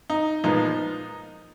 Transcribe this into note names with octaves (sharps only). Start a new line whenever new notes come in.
D#4
A#2 F3 G#3 B3 D#4